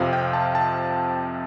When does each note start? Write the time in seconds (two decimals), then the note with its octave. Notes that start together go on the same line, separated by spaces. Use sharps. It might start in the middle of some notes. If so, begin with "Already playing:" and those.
Already playing: F2 C3 F3 C4 F5
0.13 G5
0.33 A5
0.55 A5